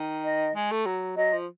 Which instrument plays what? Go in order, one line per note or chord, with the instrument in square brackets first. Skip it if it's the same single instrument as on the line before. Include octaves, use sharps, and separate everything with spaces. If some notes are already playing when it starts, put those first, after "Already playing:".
Already playing: [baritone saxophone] D#3
[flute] D#5
[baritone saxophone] G#3
A3
F#3
[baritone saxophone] F#3 [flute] D#5
[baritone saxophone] F3